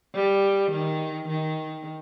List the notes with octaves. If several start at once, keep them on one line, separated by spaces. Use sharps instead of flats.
G3
D#3
D#3